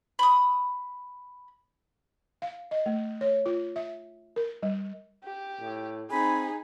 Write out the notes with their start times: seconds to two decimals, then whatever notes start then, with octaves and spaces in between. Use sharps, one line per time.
0.19 B5 D#6
2.42 F5
2.71 D#5
2.86 A3
3.21 C#5
3.46 F4
3.76 E5
4.36 A#4
4.63 G3
5.24 G4
5.61 A2
6.11 C4 D#4 G#4 B5